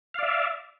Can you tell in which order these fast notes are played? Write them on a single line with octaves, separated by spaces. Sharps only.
F5 D5 E5